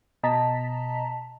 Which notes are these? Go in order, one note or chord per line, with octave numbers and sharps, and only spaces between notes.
B2 D#5 A5 A#5 B6